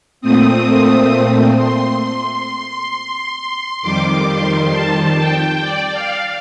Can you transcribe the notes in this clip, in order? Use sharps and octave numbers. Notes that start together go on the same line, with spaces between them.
A#2 A3 C4 D#6
C6
F2 D#3 G3 D6
C6
A5
G5
D5
F5